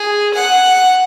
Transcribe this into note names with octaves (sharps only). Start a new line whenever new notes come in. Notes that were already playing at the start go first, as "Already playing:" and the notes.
Already playing: G#4
F#5